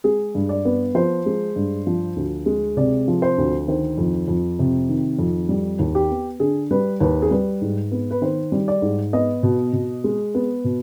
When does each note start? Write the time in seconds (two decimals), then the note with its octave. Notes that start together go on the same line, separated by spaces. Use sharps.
0.04 G#3 G#4
0.35 G2
0.49 D5
0.65 B3
0.95 F3 C5
1.26 G#3
1.56 G2
1.87 F3
2.16 D2
2.46 G#3
2.77 C3 D5
3.08 F3
3.22 C5
3.38 D2
3.68 D#3 C5
3.98 F2
4.28 F2
4.59 C3
4.89 D#3
5.19 F2
5.49 G3
5.79 D#2
5.95 G4
6.11 B3
6.40 D3 G#4
6.71 G3 B4
7.01 D#2 B4
7.22 G#4
7.31 G3 B4
7.61 G#2
7.92 B3
8.11 B4
8.21 D#3 C5
8.52 G3
8.68 D5
8.82 G#2
9.13 B3 D#5
9.43 B2
9.73 B2
10.04 G#3
10.35 B3
10.64 B2